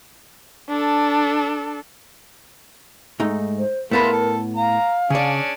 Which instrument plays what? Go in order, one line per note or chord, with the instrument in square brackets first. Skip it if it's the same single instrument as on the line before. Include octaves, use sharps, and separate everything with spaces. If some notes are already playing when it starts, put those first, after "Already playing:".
[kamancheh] D4 A4
[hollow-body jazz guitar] G#2 A3 D#4
[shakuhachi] C5
[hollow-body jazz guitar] A2 B3 B5 [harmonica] G#3 A3 F4 [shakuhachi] A#4
[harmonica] A4
[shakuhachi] F5 [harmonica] A#5
[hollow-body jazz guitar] C#3 D5 [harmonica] C#4 D4 G#4